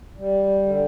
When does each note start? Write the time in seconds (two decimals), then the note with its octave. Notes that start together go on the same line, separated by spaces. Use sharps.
0.17 G3
0.63 D3